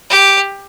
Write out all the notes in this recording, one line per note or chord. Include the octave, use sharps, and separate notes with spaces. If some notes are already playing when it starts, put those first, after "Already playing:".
G4